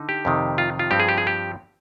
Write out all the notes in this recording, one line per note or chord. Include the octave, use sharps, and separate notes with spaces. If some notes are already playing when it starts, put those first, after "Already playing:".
Already playing: D3 D#4
G4
F2 C3 D#3
F4
F4
G2 F3 C4 G4
G#4
G4
G#4
G4